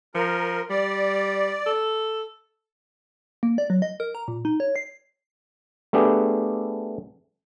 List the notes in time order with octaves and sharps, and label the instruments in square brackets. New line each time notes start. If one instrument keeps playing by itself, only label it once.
[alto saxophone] F3 [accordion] A#4
[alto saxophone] G3 [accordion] D5
[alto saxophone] A4
[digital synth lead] A#3
D5
F#3
D#5
A#4
A#5
A#2
D#4
C#5
C7
[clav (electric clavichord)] A3 B3 D4 G4 G#4